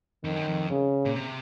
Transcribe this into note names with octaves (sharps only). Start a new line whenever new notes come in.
F2 D#3
F#2
F2
C#3
A#2
C3